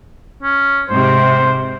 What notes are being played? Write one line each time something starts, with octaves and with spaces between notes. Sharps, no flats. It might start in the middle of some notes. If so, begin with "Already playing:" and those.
C#4
G#2 C3 C5